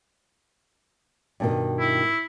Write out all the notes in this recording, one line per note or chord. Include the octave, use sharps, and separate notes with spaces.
G2 B2 D#3
E4